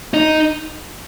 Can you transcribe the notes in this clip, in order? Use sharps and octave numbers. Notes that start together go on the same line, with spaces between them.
D#4